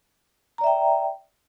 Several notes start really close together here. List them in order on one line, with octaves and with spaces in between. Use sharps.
A#5 D5 E5 G5